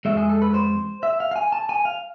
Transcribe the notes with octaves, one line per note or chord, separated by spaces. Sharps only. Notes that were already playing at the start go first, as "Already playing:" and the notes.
F2 E3 G#3 E5
G#4
A4
B4
C5
E5
F5
F5
G#5
A5
G#5
F5